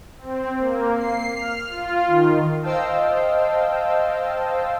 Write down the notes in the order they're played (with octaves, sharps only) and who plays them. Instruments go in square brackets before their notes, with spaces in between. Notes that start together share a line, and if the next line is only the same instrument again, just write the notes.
[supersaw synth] C4
A#3
C7
F6
F4
D#3
[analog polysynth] C5 D#5 F5 G5 A5 E6